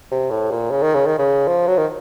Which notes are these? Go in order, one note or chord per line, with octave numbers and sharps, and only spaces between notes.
C3
A2
A#2
C#3
D#3
C#3
D#3
C#3
F3
F#3
D#3